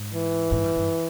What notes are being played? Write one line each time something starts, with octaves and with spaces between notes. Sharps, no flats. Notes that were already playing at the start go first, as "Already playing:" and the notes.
Already playing: G#2
E3
G#2
G2
G2